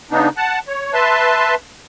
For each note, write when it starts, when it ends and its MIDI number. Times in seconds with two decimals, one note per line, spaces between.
0.11 0.29 49
0.11 0.29 59
0.11 0.29 62
0.11 0.29 63
0.37 0.59 78
0.37 0.59 81
0.68 0.93 73
0.93 1.55 71
0.93 1.55 76
0.93 1.55 81
0.93 1.55 84